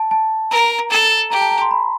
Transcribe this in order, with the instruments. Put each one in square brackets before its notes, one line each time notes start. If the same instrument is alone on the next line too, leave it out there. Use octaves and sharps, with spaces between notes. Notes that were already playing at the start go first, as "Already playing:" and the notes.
Already playing: [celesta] A5
A5
[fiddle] A#4 [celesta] A#5
[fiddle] A4
[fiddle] G4 [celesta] A#5
[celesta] A5
A#5
C6
B5